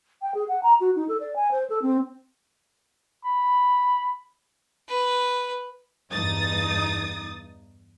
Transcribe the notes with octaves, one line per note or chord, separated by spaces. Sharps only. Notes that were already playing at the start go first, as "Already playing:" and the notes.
G5
G#4
F#5
A#5
F#4
D#4
A4
D5
G#5
C5
A4
C4
B5
B4
E2 G2 D#4 D#6 A6